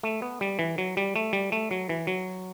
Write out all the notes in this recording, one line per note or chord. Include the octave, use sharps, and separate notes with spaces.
A3
B3
G3
E3
F#3
G3
A3
G3
A3
F#3
E3
F#3